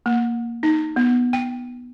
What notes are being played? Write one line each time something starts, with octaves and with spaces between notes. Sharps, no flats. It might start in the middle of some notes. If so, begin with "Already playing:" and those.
A#3
D#4
B3
G5